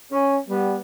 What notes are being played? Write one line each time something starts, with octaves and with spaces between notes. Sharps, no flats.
C#4
G3 B3